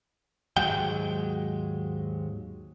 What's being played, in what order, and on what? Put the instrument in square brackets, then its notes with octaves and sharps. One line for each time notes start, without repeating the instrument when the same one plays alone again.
[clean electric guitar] D#2 G#2 F#3 G#3 G5